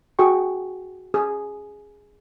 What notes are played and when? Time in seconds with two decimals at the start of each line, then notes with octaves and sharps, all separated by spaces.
0.19 F#4 G#4 G5 C#6
1.14 G#4